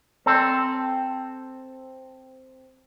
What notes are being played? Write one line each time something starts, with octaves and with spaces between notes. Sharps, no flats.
C4 A4